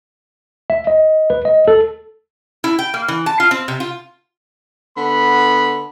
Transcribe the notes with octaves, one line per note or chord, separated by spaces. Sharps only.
E5
D#5
B4
D#5
A4
E4
G5
A#3
E3
A5
F4
C4
C3
F4
D3 B3 B5